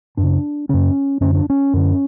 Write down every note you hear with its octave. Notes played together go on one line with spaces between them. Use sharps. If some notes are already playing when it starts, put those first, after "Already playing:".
F#2 D4
C#3
F#2 C#3 C#4
F#2 D3 C#4
D4
C#4
F#2 D3